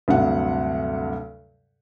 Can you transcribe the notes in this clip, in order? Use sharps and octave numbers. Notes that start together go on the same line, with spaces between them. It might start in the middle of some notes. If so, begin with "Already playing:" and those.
D2 G2 C3 F#3 F#5